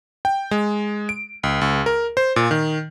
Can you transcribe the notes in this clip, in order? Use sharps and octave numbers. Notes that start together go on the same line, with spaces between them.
G5
G#3
D7
C#2
C#2
A#4
C5
A#2
D#3